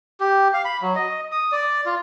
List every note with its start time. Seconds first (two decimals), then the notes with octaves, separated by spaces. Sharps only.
0.20 G4
0.54 F5
0.65 B5
0.82 F#3
0.96 D#5
1.32 D#6
1.52 D5
1.86 F4